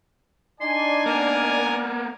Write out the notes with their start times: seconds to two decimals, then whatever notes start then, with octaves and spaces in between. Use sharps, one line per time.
0.61 D4 D#4 D5 G#5 C6
1.06 A#3 B3 A#4